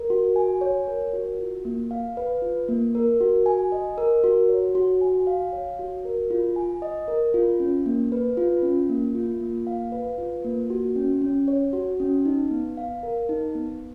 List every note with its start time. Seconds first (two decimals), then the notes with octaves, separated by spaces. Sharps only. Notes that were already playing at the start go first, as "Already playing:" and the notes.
Already playing: A#4
0.10 F#4
0.36 G#5
0.61 C#5
0.87 A#4
1.13 F#4
1.39 F4
1.65 A#3
1.91 F5
2.17 B4
2.42 F4
2.68 A#3
2.95 A#4
3.21 F#4
3.46 G#5
3.72 D#5
3.98 A#4
4.24 F#4
4.49 C#5
4.75 F#4
5.01 G#5
5.27 F5
5.52 C#5
5.79 F#4
6.05 A#4
6.30 F4
6.56 G#5
6.82 D#5
7.08 A#4
7.34 F4
7.60 C#4
7.86 A#3
8.12 B4
8.37 F4
8.63 C#4
8.89 A#3
9.15 F4
9.41 A#3
9.67 F5
9.92 B4
10.18 F4
10.45 A#3
10.70 F#4
10.96 C#4
11.22 C#4
11.48 C#5
11.73 F#4
12.00 C#4
12.26 D#4
12.51 B3
12.77 F5
13.03 A#4
13.29 D#4
13.55 B3